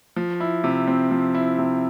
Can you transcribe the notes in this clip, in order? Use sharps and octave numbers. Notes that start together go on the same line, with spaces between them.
F3
E4
C3
C4
F3
E4
C3